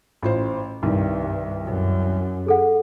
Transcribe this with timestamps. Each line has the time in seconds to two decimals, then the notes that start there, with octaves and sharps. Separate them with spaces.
0.23 A1 F4 C5
0.83 C2 G2 D#3
1.65 F#2
2.46 G#4 A4 F#5